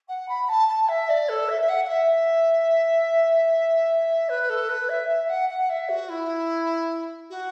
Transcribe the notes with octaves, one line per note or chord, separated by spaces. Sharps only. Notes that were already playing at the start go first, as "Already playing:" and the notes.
F#5
B5
A5
A5
E5
D5
A4
E5
E5
F#5
F#5
E5
B4
A4
B4
E5
E5
F#5
F#5
E5
F#4
E4
F#4